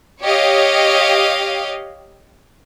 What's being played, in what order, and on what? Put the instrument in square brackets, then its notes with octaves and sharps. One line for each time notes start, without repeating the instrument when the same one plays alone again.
[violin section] G4 C#5 D#5 F5